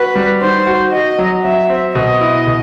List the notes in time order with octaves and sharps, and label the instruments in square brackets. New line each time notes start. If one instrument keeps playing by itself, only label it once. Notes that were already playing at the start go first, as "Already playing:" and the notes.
Already playing: [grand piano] F#4 [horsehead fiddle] B4
[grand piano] G3
[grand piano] D#3 [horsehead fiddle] C5
[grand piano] F#4
[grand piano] F#4 [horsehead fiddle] D#5
[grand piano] F#3
[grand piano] F#3 [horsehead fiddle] E5
[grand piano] C4
[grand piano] B2 [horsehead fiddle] D#5
[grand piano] E4
B2